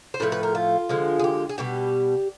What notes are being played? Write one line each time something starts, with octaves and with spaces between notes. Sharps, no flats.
C5
A2 F3 A3 B4
B4
A#4
F4
D3 F3 G#3
G#4
G4
G#4
B2 G3 G4